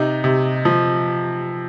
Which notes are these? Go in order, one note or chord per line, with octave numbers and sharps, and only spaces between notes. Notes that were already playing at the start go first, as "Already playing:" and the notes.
Already playing: C3 D#4
C3
F3